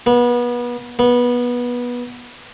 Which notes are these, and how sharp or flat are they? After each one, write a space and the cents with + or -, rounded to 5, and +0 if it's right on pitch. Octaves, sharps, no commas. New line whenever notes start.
B3 -30
B3 -20